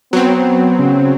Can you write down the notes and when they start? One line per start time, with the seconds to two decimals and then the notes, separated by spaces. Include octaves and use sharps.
0.13 F#3 B3 C4
0.79 C#3